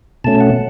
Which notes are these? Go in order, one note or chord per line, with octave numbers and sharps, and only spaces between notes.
B2 A3 C#4 A5
F#5